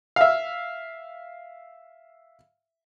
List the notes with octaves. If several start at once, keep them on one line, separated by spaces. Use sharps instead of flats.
E5 F5